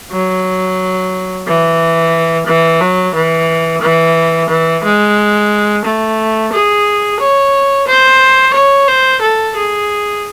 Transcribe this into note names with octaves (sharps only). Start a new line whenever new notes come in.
F#3
E3
E3
F#3
E3
E3
E3
G#3
A3
G#4
C#5
C5
C#5
C5
A4
G#4